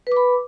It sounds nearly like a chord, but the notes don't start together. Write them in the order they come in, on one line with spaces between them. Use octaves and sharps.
B4 D6 B5